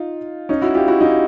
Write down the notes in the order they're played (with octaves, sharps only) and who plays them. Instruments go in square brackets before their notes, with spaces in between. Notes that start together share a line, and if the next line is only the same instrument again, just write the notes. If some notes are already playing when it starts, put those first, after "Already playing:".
Already playing: [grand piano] D#4 F4
C#4 D#4
E4 F#4
F4 G4
E4 F#4
D#4 F4